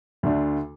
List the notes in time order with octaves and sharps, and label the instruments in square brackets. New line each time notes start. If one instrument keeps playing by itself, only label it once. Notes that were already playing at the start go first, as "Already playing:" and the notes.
[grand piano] D2 D3 A3 D4